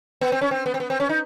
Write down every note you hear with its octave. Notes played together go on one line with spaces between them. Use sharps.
B3
C4
C#4
C4
B3
C4
B3
C4
C#4
D#4